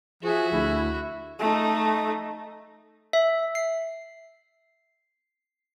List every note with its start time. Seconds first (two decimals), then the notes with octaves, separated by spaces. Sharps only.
0.23 F3 F#4 G#4 E5
0.52 D2 E4
1.39 A3 D#4
3.13 E5
3.55 C7